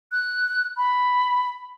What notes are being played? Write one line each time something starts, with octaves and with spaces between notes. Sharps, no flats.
F#6
B5